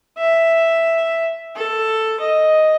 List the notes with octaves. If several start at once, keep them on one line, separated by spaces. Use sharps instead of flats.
E5
A4
D#5